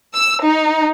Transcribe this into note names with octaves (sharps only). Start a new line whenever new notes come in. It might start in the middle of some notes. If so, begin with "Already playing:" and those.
E6
D#4